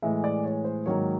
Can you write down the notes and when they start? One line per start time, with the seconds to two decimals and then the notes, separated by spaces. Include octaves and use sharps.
0.02 A2 E3 G#3 E5
0.24 D5
0.45 C#5
0.64 C5
0.86 G#2 D#3 F#3 A#3 C#5